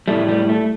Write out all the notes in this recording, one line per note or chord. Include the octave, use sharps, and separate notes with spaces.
A2 G3 A3
G3
A3